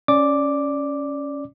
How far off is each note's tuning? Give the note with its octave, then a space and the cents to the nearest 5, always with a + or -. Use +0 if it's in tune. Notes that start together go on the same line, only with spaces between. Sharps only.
C#4 +5 D5 +0 D6 +0